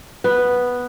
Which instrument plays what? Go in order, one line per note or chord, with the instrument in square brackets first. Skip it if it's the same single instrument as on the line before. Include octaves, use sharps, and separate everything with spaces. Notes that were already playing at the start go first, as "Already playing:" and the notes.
[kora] B3